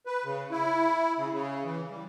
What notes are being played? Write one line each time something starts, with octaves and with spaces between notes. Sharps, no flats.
B4
C#3
E4
C#3
C#3
E3
G3